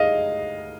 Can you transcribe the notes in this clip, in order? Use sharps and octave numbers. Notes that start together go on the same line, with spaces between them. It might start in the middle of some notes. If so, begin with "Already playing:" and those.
Already playing: G#3 D#4 G#4 D#5 F5